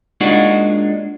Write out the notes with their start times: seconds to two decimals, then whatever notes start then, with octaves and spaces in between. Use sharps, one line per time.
0.21 G#3 A#3 D4 D#4 F4 F#4